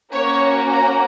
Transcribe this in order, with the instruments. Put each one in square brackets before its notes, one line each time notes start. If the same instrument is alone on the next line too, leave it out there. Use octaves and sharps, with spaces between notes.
[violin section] A#3 C#4 F#4 C#5
A#5